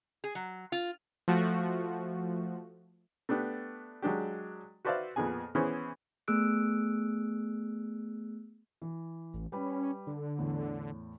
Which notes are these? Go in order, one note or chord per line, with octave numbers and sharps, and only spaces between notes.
G#4
F#3
F4
F3 A3 F#4
A3 B3 D4 G4
F#3 G#3 D4 G4
F#4 B4 C5 D5 E5 F5
F2 A#2 B3 G#4 G#5
E3 B3 C#4 E4 G#4 C5
A3 B3 G#4 E6 F#6 D7
E3
A1
G3 C#4 B4 B5
D3
E2 A2